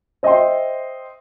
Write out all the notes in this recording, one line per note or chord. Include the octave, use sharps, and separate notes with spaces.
C5 D#5 E5 G5 C6